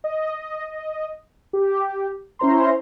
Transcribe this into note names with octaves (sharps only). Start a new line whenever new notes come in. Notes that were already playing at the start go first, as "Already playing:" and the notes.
D#5
G4
C#4 E4 C5 A#5 C6